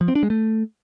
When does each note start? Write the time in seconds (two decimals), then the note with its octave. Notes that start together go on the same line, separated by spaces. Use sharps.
0.01 F3
0.08 C4
0.15 D4
0.23 G#3
0.30 A3